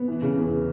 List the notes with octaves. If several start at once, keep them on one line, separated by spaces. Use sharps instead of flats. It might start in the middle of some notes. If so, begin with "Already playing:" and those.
Already playing: B3
E3
C#3
E2